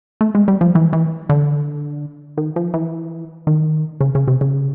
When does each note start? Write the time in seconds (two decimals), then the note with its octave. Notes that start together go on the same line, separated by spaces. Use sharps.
0.21 A3
0.35 G#3
0.48 G3
0.61 F3
0.75 E3
0.93 E3
1.29 D3
2.37 D#3
2.56 F3
2.74 E3
3.47 D#3
4.01 C#3
4.15 C#3
4.28 C3
4.41 C#3